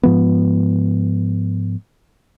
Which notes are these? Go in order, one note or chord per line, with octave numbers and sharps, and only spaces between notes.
G#2 F3 B3